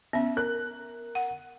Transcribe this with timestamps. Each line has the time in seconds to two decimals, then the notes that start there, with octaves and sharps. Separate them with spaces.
0.13 B3 C#4 E5
0.37 A#4 F#6
1.15 F#5